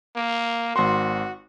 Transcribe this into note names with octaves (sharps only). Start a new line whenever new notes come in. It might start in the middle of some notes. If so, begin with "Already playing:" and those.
A#3
G#1 F#4 C6